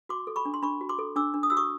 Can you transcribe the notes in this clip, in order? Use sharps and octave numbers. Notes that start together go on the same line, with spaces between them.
F#4 C6 D6
A4
B5 C#6
D4
C6
D4 B5 C#6
F#4
C6 D6
A4
D4 D6 E6
D4
D#6
F#4 E6
C#6 D#6